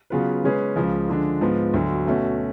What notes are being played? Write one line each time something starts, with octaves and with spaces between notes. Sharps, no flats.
C#3 F#3 B3 F4 B4
C#3 G#3 C#4 G#4 B4
C#2 C#3 F3
D3 F3 G#3 D4
G#2 F3 B3 F4
D2 D3 F#3
B2 A3 C#4 F#4